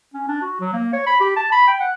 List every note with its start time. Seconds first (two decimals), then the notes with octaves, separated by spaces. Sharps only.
0.14 C#4
0.28 D4
0.41 F#4
0.60 F#3
0.74 A#3
0.93 C#5
1.07 B5
1.20 G4
1.36 A5
1.52 B5
1.67 G5
1.80 F#5